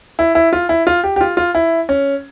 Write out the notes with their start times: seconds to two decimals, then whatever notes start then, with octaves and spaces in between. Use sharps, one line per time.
0.19 E4
0.35 E4
0.53 F4
0.69 E4
0.87 F4
1.04 G4
1.16 G4
1.21 F4
1.37 F4
1.55 E4
1.89 C#4